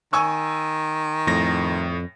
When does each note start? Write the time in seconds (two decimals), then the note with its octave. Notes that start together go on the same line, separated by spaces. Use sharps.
0.13 D#3 G#5 C#6 E6
1.27 F2 A2 A#6